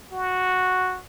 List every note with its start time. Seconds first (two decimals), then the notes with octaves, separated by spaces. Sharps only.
0.12 F#4